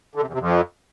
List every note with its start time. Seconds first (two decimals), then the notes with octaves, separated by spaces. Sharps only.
0.15 D3
0.21 C3
0.27 E2
0.33 C3
0.39 F2